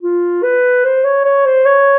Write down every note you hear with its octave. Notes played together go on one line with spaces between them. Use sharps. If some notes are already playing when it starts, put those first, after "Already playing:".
F4
B4
C5
C#5
C#5
C5
C#5